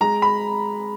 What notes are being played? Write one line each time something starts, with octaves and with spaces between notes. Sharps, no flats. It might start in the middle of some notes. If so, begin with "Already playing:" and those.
G#3 A#5
B5